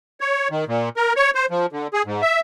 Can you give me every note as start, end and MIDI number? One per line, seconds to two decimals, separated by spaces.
0.21 0.48 73
0.51 0.65 51
0.68 0.89 46
0.97 1.13 70
1.16 1.31 73
1.35 1.46 72
1.51 1.66 53
1.73 1.87 50
1.93 2.02 68
2.06 2.22 44
2.22 2.40 76